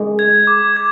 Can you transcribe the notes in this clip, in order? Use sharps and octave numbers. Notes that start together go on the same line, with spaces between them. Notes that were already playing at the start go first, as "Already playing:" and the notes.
Already playing: G#3
G#6
D6
G#6